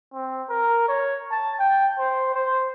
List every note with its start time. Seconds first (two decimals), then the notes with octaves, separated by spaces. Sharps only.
0.14 C4
0.49 A#4
0.88 C#5
1.31 A5
1.60 G5
1.99 C5
2.35 C5